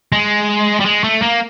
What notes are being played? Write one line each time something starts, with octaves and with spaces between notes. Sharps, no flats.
G#3
G3
G#3
A3
A#3